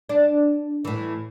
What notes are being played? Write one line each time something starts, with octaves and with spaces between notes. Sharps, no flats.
D4
A2 E3